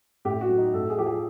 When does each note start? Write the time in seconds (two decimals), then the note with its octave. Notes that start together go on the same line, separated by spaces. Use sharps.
0.25 A2 G4
0.41 F#4
0.49 F#3
0.58 D#4
0.73 A2 A4
0.90 G#4
0.98 F3 G4
1.07 G#4